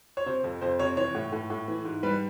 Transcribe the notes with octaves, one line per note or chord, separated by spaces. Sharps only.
C#5
C3 C5
F2
F2 C5
C3 C#5
E3 C#5
A2
A2
A2
E3
G#2
G3 B4